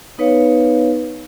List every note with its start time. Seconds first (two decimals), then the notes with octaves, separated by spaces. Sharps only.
0.18 B3 D#4 B4 C#5 F5